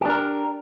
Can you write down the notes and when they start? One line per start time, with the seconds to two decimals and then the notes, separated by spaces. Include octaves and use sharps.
0.01 G4
0.06 D4
0.10 A#4